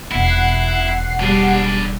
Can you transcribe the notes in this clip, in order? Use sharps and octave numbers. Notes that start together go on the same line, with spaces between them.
E1 B2 E4 F#5 C7
G3 D4 G#4